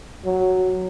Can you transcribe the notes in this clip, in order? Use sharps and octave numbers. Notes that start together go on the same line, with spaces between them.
F#3